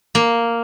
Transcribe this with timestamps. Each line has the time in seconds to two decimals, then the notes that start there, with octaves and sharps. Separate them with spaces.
0.15 A#3